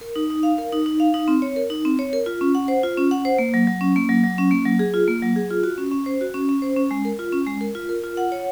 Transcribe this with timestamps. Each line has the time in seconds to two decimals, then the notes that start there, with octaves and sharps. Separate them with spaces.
0.01 A#4
0.16 D#4
0.30 D#4
0.43 F5
0.58 A#4
0.72 D#4
0.86 D#4
1.00 F5
1.14 D#4
1.28 C4
1.42 C#5
1.56 A#4
1.70 D#4
1.85 C4
1.99 C#5
2.13 A#4
2.26 F4
2.41 C#4
2.55 F#5
2.68 C5
2.83 F4
2.97 C#4
3.11 F#5
3.25 C5
3.38 A#3
3.54 F#3
3.67 F#3
3.81 C#4
3.96 A#3
4.09 F#3
4.24 F#3
4.38 C#4
4.51 A#3
4.65 F#3
4.79 G#4
4.94 F4
5.08 A#3
5.22 F#3
5.36 G#4
5.50 F4
5.63 F#4
5.78 C#4
5.92 C#4
6.06 C5
6.21 F#4
6.34 C#4
6.49 C#4
6.62 C5
6.77 C#4
6.91 G#3
7.05 A#4
7.19 F4
7.32 C#4
7.47 G#3
7.61 A#4
7.75 F4
7.89 A#4
8.04 F4
8.17 F#5
8.32 C#5